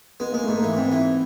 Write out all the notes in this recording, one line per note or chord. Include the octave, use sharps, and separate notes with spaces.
G#3 B3
G#3 A#3
G#2 A3
A#3
E3
G#2 C4
E3